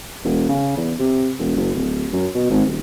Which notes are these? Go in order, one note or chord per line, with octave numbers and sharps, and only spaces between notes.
E1
C#3
E2
C3
E1
F#1
D1
F#2
B2
G#1
D#1